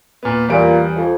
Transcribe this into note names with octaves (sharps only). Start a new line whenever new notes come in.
A#2 B3
E2 A#2 G3 D7
F2